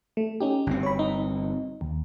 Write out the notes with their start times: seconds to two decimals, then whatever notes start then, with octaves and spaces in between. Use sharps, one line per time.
0.17 A3
0.40 C#4 D#4 G4
0.67 G1 C4
0.83 C#5 B5
0.99 D#4
1.81 D#2